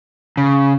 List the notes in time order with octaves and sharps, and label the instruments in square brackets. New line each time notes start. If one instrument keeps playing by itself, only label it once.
[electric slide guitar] C#3